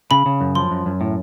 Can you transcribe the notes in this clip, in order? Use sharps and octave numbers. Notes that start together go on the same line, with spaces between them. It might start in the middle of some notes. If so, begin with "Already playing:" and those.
C#3 B5
C#3
F#2
F3 C6
F#2
F#2
A2